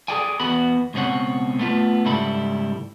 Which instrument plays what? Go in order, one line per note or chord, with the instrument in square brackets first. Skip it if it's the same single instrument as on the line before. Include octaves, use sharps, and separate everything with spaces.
[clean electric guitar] G#4 A4 D5 G5 G#5
E2 B3 F#4 B5
C#2 B2 C4 C#5 F#5
A3 B3 F4
C#2 G#2 G3 E4 A4 B5